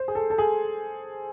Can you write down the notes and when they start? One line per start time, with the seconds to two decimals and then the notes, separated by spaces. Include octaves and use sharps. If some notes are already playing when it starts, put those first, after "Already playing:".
Already playing: C5
0.08 G#4
0.15 A4
0.30 A4
0.38 G#4